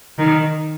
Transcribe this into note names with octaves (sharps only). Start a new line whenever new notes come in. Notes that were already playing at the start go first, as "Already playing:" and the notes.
D#3